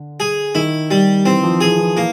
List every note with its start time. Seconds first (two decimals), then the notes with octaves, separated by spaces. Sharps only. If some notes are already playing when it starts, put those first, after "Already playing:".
Already playing: D3
0.20 G#4
0.55 D#3 E4
0.91 G3
1.25 E3 C4
1.43 F3
1.61 E3 G#4
1.78 E3
1.96 E3 A#3